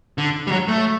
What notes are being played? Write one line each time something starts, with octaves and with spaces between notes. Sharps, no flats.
D3
G3
F#3
A3